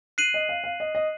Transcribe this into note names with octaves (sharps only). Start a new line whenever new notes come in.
F#6 C7 D#7 F#7
D#5
F5
F5
D#5
D#5